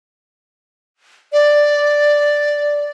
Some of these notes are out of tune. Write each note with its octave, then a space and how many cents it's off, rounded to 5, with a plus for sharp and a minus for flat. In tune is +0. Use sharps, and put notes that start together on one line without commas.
D5 +0